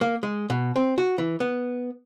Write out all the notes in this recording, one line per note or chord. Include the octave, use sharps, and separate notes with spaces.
A#3
G#3
B2
C4
F#4
E3
B3